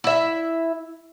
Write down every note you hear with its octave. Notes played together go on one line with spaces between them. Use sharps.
E4 E5